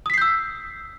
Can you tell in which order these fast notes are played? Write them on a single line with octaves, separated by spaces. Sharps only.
D#6 B6 C7 G6 E6